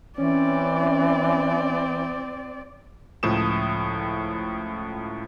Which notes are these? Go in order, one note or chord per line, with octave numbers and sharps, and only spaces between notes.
E3 C4 C#4 D5
C#2 A2 F3 D#6 E7